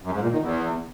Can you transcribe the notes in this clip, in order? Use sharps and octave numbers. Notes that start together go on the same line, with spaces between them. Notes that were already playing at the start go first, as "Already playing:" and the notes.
F#2
G#2
A#2
D#3
E2